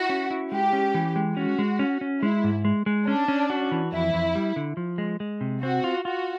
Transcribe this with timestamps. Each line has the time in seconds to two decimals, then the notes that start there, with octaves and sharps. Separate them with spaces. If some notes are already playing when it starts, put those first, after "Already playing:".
Already playing: E4 F#4
0.10 C#4
0.31 E4
0.51 G#3 G4
0.73 C#4
0.94 E3
1.16 G#3
1.36 C#4 F#4
1.59 G#3
1.79 C#4
2.01 C#4
2.22 G#3 E4
2.44 G#2
2.65 G#3
2.86 G#3
3.07 C#4 D4
3.28 C#4
3.50 F#4
3.72 E3
3.92 F2 E4
4.14 F2
4.35 G3
4.56 D3
4.77 F3
4.98 G#3
5.20 G#3
5.41 C3
5.63 C4 F#4
5.84 F4
6.05 F4 F#4